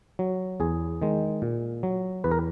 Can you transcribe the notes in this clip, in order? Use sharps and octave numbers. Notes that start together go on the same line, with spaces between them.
F#3
E2 G#4
D#3 G#3
A#2
F#3
E2 B4
A#4